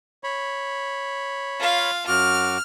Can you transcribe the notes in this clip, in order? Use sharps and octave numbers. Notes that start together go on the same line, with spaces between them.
C#5 B5
F4 F5
F#2 F#4 D6 F6